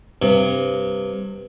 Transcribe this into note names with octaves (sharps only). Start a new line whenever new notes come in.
G2 C3